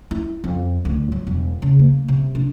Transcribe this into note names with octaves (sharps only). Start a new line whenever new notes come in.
E4
F2
D2
F#3
E1
C#3
A#3
C3
D4